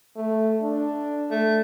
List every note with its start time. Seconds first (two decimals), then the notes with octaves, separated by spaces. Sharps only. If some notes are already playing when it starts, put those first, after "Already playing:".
0.16 A3
0.62 D4
1.31 A3